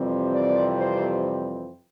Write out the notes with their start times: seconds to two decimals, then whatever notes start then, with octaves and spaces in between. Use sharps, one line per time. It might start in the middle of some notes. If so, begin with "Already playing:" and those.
Already playing: F2 C3 E3 G3 C4
0.32 D5
0.78 C5